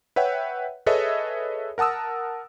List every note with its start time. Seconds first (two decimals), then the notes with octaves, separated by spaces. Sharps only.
0.16 B4 C#5 E5 F#5 G5
0.86 G#4 A4 B4 C#5 D#5 E5
1.78 A#4 F#5 A5 D#6 E6